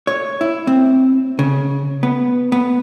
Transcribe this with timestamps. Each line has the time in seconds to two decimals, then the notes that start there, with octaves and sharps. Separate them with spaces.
0.07 C#5
0.41 E4
0.67 C4
1.39 C#3
2.03 B3
2.52 B3